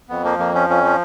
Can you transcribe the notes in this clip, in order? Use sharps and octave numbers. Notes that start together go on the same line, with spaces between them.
F2 B3
F3 A#3
F2 A#3
F3 C#4
F2 C#4
F3